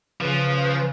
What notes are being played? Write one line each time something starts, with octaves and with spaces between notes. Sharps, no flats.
C#3 F3 B4